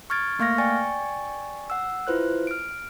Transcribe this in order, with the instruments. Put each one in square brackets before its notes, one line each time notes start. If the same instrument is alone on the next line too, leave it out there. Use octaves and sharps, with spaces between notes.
[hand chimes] C#6 F6 G#6 A6 D7
A3 A#3 F5 C#6 F6 A#6
D5 G5 G#5 C#6 A6
F#5 E6
E4 F4 B4 C5 F#6
F6 D7